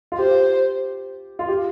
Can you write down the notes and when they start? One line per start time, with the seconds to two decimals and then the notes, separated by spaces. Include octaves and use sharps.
0.12 F4
0.18 G4 C5
1.39 F4
1.48 G4